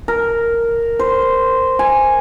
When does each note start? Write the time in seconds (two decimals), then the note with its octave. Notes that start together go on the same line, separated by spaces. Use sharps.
0.08 A#4
0.99 C5
1.79 G#5